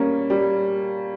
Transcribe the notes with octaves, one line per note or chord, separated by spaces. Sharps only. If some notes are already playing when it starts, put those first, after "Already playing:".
Already playing: G3 A#3 C#4
G3